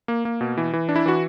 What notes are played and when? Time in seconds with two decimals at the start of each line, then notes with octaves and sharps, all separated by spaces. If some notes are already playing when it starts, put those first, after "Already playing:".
0.08 A#3
0.25 A#3
0.41 B2
0.57 E3
0.73 E3
0.89 D4
0.96 E4
1.06 E3 F#4